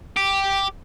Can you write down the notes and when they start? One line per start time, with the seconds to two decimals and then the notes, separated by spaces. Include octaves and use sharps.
0.17 G4